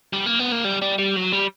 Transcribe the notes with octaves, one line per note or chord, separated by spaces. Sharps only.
G3
A#3
B3
A#3
G3
G3
G3
F#3
G3